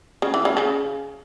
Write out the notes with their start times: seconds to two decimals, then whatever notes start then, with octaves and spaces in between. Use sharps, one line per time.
0.22 C#3
0.34 E3
0.45 C#3
0.57 C#3